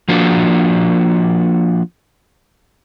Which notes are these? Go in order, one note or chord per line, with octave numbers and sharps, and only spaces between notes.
F3 A#3 D4 F#4